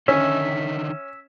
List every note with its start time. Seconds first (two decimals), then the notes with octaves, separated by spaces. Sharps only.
0.08 D3 D#3 C#4 D#4 E5